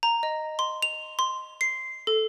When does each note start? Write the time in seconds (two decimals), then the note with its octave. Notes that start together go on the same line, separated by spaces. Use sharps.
0.03 A#5
0.23 D#5
0.59 C6
0.82 F7
1.19 C6
1.61 C7
2.07 A4